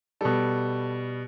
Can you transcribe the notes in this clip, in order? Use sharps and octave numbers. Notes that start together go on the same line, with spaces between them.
B2 G3 A4